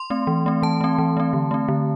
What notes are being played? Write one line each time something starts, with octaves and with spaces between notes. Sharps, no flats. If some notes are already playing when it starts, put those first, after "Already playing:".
Already playing: C6
A3 C4
E3
A3 C4
E3 A5
A3 C4
E3
A3 C4
D3
A3 C4
D3